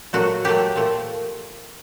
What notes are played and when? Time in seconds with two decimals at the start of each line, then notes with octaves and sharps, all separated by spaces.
0.13 A#2 F#3 A3 F#4
0.44 A#2 F#3 A3 G4
0.76 A#2 F3 A3